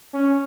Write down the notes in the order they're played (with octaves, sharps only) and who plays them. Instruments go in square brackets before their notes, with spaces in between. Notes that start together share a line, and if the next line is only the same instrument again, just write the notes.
[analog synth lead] C#4